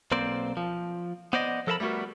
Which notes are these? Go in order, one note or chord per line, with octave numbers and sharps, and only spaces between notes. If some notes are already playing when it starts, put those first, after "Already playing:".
B1 A#3 C4 C5 D5
F3
B3 C5 D5 D#5
F3 A4 A#4 E5 A5 B5
G3 A3 B3 F#4 A#4